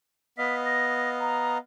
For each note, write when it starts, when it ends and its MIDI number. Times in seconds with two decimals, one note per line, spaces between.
0.38 1.58 59
0.38 1.58 75
0.38 1.58 77
0.38 0.56 95
0.65 1.10 94
1.20 1.58 82